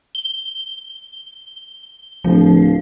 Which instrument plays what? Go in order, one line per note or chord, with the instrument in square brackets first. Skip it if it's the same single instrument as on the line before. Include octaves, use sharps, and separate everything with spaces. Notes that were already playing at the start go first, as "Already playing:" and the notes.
[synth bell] G7
[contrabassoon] D1 [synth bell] F3